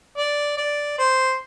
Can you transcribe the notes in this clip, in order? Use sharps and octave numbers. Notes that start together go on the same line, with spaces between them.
D5
D5
C5